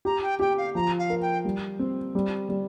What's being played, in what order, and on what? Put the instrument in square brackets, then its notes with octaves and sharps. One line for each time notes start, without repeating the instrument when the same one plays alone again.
[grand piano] G4 [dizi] A#5
[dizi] G5
[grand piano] G4 [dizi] G5
[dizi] F5
[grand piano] F3 [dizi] A#5
[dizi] F5
[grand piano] A#4
[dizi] G5
[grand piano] G3
C4
G3
G3